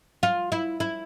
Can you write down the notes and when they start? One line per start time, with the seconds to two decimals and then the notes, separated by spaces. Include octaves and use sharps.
0.23 F4
0.52 E4
0.80 E4